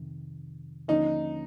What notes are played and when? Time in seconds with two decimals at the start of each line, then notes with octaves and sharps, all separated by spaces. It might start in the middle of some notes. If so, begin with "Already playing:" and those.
Already playing: F2 C3 D#3
0.88 D#2 D3 F3 A#3 C#4 D#4